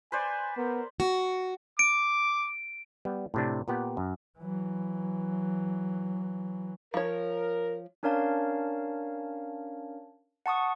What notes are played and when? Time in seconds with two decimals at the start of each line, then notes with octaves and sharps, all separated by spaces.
0.12 B4 C5 D5 G#5
0.57 B3 A#4
1.00 F#4
1.79 D6 D7
3.05 G3 B3
3.34 A2 C3 D4
3.68 A#2 B3 G4 F#5 G5
3.97 F#2
4.39 E3 F#3
6.94 F3 A#4 C#5
8.03 C#4 D4 A#4 C#5 F5 A5
10.46 F#5 A5 C#6 D#6